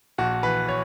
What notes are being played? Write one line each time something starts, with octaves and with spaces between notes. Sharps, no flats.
A#1 F#4
E3 B4
C#5